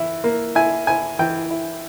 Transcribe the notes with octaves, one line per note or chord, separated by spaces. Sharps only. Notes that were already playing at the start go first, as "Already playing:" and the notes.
Already playing: E3 E4
A#3
E4 G#5
E4 G#5
E3 G5
E4